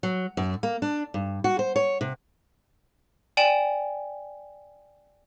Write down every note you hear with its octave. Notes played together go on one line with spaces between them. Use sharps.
F#3
F#2
A#3
D4
G2
F#4
C5
C#5
C3
D5 G5 G#5 E7 F#7